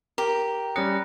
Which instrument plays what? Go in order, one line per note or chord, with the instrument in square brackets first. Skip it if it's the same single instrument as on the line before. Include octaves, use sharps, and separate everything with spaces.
[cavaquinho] G4 [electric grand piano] A#4 [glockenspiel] A#5
[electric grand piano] G3 C#4 C#7 [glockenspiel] D#6 F#6 A#6